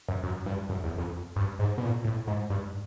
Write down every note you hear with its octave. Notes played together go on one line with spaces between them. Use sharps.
F#2
F#2
G2
F#2
E2
F2
G2
G#2
B2
A#2
A2
G#2
G2